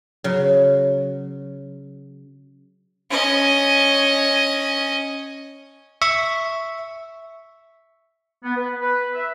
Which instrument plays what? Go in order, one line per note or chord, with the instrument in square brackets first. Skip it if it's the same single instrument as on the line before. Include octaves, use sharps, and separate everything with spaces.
[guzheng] C#3 F#3
[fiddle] C#4 D#5
[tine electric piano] E5 C#6
[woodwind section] B3
B4
B4
E5